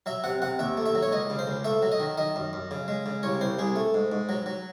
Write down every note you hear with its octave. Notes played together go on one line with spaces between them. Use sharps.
F#3 E5
C3 F#5
C3 F#5
D#2 E5
A3
E5
F#3
C#5
C#2 D#5
C#3
C5
C#2
A3 E5
F#3
D#5
D#3
D#3 D#5
F#2
F#2
C#3
G#3
C#3
C2 C#5
C2 C5
C2 G#4
A3
G#2
G#2
F#3
F#3